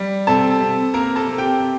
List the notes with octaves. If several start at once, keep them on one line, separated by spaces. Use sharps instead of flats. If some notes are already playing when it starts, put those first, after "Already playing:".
Already playing: G3
C3 A4 A5
C3
A#3 A#4 A#5
A4 A5
C3
G4 G5
C3